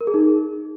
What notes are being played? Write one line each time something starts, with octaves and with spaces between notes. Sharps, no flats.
A#4
G#4
D#4